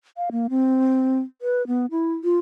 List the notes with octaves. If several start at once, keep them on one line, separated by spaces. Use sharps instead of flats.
F5
A#3
C4
B4
B3
E4
F4